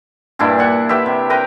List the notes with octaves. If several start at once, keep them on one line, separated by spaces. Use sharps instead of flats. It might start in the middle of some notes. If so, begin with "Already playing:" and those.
G2 A#2 D4 E4
E5 F#5
G4 B4 E5
C3
A#4 B4 G5 A#5